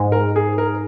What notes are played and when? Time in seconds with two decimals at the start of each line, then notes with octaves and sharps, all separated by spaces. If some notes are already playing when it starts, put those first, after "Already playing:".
Already playing: G#2
0.12 A#4
0.36 G#4
0.58 A#4